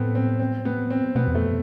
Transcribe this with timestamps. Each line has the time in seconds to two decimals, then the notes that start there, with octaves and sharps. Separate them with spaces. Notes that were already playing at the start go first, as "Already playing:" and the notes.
Already playing: A2 A3 B3 C4
0.15 C4
0.39 C4
0.65 B3
0.90 C4
1.15 B2 B3
1.28 E2
1.35 F2 A3